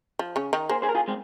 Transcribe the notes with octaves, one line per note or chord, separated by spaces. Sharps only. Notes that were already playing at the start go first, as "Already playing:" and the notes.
F3
C#3 C#4
D#3 D#4
A#3 G#4 C5
G#4 C5
A#4
F4 G#4
G#3 C4